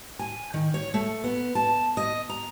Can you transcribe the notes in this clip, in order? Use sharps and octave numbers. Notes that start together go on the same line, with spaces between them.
G#5
D#3
C#5
A3
B3
A5
D#5
A#5